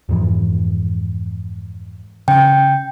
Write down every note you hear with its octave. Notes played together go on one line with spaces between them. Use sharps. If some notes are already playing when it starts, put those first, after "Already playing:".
F2 G#2 E3
C#3 C#4 G5